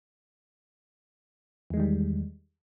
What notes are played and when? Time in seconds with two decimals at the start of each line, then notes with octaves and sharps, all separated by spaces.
1.70 E2
1.74 G#3
1.77 D#3
1.80 G3